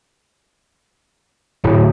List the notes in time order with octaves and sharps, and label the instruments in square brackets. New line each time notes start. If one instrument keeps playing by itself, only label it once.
[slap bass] D1 [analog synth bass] A2